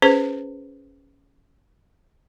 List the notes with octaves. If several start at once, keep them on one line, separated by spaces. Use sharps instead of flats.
C#4 G#4 B4 C5